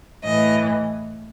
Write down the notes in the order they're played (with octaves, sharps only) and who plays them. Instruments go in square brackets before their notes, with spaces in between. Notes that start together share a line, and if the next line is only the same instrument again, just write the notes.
[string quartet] A2 E3 D#5